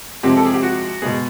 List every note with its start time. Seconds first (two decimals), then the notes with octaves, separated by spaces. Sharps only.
0.23 C3 F3 G#3 C4 G4
0.37 A4
0.45 G#4
0.54 G4
0.63 F#4
1.02 B2 G#3 B3 G#4